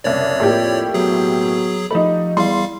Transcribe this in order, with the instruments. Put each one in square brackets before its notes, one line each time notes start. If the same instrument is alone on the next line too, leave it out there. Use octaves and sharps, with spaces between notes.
[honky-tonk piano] F#1 C2 [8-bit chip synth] C#5 D5
[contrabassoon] F2 [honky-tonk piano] A2 A#3 G4
[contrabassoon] B2 [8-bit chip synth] F#3 G#4 [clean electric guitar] A3
[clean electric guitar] F3 G4 B5 [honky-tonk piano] A3 D#4
[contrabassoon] E2 [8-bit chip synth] G3 F5 [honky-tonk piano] C6